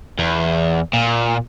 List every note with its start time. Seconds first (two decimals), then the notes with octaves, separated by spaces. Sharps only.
0.19 E2
0.93 A#2